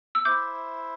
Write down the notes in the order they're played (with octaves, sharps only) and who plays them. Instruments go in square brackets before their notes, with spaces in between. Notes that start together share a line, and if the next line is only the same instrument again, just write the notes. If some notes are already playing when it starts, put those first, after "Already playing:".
[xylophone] E6
[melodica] E4 C5 E5 [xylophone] D6 G6